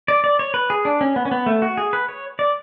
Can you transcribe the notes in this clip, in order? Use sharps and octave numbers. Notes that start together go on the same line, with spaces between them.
D5
D5
C#5
B4
G#4
D4
C#4
B3
C#4
B3
A3
F#4
G#4
B4
C#5
D5